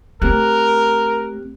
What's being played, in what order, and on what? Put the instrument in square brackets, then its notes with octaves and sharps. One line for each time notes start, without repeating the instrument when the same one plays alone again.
[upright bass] A3 [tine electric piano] C4 G4 F#6 [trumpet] A#4